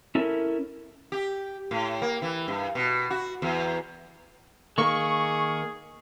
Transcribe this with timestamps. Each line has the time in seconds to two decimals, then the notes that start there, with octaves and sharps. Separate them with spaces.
0.15 C#4 E4 A4 A#4
1.12 G4
1.71 A2
2.02 A#3
2.22 E3
2.48 G2
2.75 B2
3.10 F#4
3.42 E2
4.78 D#3 A#3 G#4 C#6